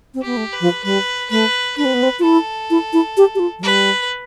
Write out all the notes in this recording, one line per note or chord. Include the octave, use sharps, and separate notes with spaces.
C4
B3 G4
A3
B4
F3
G3 B4
A3 B4
D4 B4
C4
B3
C4
F4
E4 A4
E4
E4
G4
G4
F4
F3
G3 B4